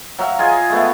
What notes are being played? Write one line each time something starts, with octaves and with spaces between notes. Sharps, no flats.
F#3 E5 F5
F4 G#4 D#5 G#5
G#3 A3 B3